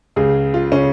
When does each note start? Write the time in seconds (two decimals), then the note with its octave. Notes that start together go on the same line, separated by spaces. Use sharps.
0.16 C#2 C#3 G#4
0.54 F4
0.72 C#3 C#4